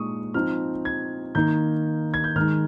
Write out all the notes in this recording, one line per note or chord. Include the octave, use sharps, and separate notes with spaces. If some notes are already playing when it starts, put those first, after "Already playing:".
Already playing: A#2 G#3 D#4 C#6 D#6
F3 C4 D#4 F6
G#6
D#3 A#3 D#4 G6
G#6
G6
D#3 G#3 D#4 F6